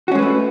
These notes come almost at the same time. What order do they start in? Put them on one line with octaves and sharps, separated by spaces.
F#4 C#4 G#3 B4 A3